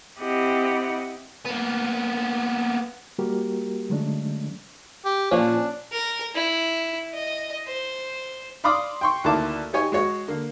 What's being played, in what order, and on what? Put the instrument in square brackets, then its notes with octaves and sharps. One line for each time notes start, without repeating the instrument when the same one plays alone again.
[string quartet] C4 E4 G4 D#5 F#5
[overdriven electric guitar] A#3 B3
[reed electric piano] G3 A#3 F#4 G4 A#4
D3 F#3 G#3 A3 C#4 D4
[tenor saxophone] G4
[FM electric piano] A#2 F3 C#4 [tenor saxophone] D4
[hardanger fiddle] A#4
E4
D#5
C5
[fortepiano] D5 F5 B5 C6 D6 D#6
G5 C6 C#6
D2 D#3 A#3 E4 A5 D6
D#4 G4 C#5 G#5
G#3 F#4 C#5
D3 A#3